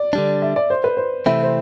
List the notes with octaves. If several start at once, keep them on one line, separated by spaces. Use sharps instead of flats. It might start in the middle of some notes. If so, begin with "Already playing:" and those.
Already playing: D5
D3 G3 D4
E5
D5
C5
B4
C5
C3 E3 A3 C4 E4 E5
C5